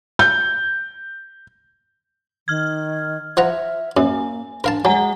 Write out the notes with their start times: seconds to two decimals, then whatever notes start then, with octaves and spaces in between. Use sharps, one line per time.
0.19 G6
2.48 D#3 F6 G#6
3.37 F3 E5 F#5 A#5
3.97 F#2 A#3 G#5
4.64 D4 A#4 F5 A5
4.85 F#3 G#3 F#5 G#5 A#5